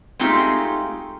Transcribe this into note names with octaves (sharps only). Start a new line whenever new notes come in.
G#3 A3 C4 D#4 F4 G4